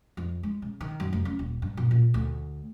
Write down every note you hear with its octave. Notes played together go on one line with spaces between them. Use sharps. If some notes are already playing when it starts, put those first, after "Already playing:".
F2
G#3
C#3
D#3
F#2
F1
C#4
D#1
G2
A#2
A#2
D2